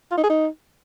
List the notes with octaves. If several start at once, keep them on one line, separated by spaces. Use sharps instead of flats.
F4
D#4
G#4
D#4